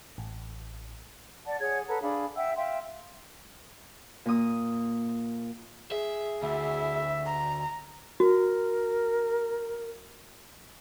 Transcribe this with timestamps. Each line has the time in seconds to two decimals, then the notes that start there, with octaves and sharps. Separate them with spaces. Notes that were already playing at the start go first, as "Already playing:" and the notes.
0.18 A1
1.46 D5 F#5 A5
1.60 G#4 C#5 F#5 G#6
1.88 A4 B4 F#5 A#5
2.02 D4 G#4 F5 B5
2.36 E5 F#5 G5 E6
2.57 E5 F5 G5 C6
4.26 A#2 D#6
5.92 G#4 E5
6.43 D2 E4 E5
7.26 A#5
8.20 F#4 A#4